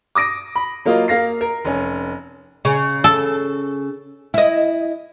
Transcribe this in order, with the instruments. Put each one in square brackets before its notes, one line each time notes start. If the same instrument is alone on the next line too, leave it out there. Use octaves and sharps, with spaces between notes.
[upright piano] D6 D#6 A#6 D7
B5
F#3 A#3 F4 D#5
A#3 F5 A#6 C7
A#4
F1 C#4
[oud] C#3
[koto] A4
[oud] E4 D#5